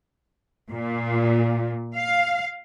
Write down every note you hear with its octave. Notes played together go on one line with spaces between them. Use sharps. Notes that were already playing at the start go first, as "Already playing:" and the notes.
A#2
F5